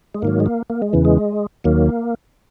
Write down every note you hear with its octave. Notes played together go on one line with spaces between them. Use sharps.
G#3
G#2 D#3 F#3 A#3
G#3
A#3
A#3
G#3
E2 C#3 E3
G#3
D#2 D#3 F#3 A#3